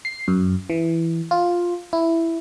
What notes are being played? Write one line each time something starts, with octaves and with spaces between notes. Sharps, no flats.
C7
F#2
E3
F4
E4